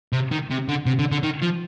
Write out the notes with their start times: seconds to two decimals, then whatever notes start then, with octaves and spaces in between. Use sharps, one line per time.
0.12 C3
0.31 D#3
0.50 C3
0.68 D3
0.86 C3
0.99 D3
1.12 D3
1.23 D#3
1.42 F3